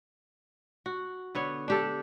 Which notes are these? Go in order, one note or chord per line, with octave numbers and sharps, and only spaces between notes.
F#4
D3 B3 C#5
D4 G4 A4